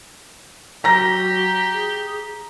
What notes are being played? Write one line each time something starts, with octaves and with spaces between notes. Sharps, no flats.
F#3 G4 A#5 A#6
G#4